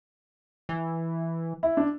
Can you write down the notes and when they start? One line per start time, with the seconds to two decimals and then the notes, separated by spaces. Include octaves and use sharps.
0.69 E3
1.63 E4
1.77 D4